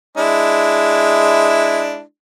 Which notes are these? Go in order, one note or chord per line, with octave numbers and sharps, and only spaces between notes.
G#3 D4 E4